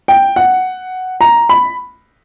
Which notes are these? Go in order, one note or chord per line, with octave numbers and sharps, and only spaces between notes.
G5
F#5
A#5
B5